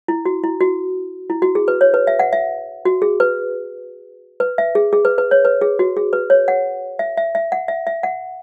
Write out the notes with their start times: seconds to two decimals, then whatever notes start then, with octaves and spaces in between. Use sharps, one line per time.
0.08 E4
0.25 F#4
0.43 E4
0.61 F#4
1.30 E4
1.42 F#4
1.55 G#4
1.68 B4
1.81 C#5
1.94 B4
2.07 E5
2.19 F#5
2.33 E5
2.85 F#4
3.02 G#4
3.20 B4
4.40 B4
4.58 E5
4.75 G#4
4.93 G#4
5.05 B4
5.18 B4
5.31 C#5
5.45 B4
5.61 G#4
5.79 F#4
5.97 G#4
6.13 B4
6.30 C#5
6.48 F#5
6.99 E5
7.17 E5
7.35 E5
7.52 F#5
7.68 E5
7.87 E5
8.03 F#5